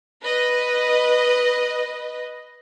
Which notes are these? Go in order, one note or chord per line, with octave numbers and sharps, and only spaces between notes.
B4 D#5